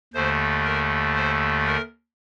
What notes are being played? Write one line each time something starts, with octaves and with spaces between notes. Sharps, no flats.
D#2 D3 A3 C5
A#4
C5
A#4